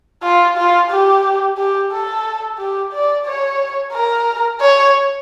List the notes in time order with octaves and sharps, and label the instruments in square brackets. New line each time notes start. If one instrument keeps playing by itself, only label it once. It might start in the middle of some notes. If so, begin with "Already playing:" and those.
[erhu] F4
F4
G4
G4
A4
G4
D5
C#5
A#4
C#5